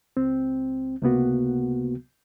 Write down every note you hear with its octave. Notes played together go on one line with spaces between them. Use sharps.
C#2 C4
C#2 C3 A#3 B3 F#4